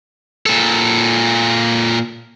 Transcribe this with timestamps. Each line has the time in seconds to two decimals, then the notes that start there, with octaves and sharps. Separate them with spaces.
0.46 A#2 A4